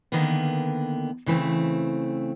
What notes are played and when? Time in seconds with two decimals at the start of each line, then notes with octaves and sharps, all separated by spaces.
0.12 D3 D#3 A#3 B3
1.26 C#3 E3 A3 C4